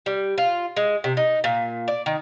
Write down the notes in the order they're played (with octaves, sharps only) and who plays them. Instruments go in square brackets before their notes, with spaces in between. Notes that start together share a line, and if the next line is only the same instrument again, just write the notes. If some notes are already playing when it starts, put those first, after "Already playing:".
[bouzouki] G3
F4
G#3
C3
D#4
A#2
D5
D#3